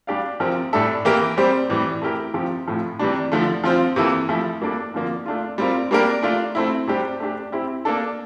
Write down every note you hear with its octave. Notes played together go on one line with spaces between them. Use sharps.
G3 D4 G4 D5 F5
C3 F3 C4 G4 A#4
A2 G3 D4 A4 E5
E3 A#3 E4 G4 A#4
G3 C4 G4 C5
A2 E3 G3
A3 E4 G4 A#4
C3 F3 C4 G4
A2 F3 A3
C3 E3 G3 D4
D3 F3 A3
F3 C4 F4 C5
C3 E3 A#3 E4 A4
F3 A3 E4
G3 A#3 D4 A4 D5
D3 F3 A#3
A3 D4 F4
G3 C4 F4 A#4
G3 A#3 D4 G4 A#4
A3 D4 F4
A3 C4 E4
C3 G3 D4 G4 C5
A3 D4 G4
C4 E4 G4
A#3 D4 A4